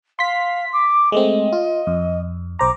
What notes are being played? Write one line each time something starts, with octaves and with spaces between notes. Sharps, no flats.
F5 C6 B6
D6
G#3 A3 C4 D#5
F4
F2
B1 C5 A#5 D6